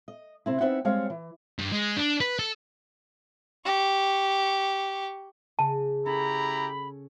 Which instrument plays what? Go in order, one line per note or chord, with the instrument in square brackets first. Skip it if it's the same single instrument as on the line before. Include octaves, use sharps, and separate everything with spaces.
[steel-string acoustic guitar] D#5
C3 C4 E4
B3 C4 D#4 E4 E5 F#5
G3 G#3 C4 C#5 F5
E3
[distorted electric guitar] G2
G#3
D4
B4
A4
[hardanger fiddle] G4 C#6
[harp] C#3 [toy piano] A5
[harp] C#4 A4 [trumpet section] E4 G4 A#5 [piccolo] B5